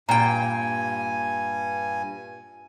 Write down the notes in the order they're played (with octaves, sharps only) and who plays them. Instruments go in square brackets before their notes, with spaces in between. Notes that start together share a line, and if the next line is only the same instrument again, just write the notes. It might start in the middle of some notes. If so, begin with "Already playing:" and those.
[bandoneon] G2 G#5 [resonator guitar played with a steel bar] A#2 G5 [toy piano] A#5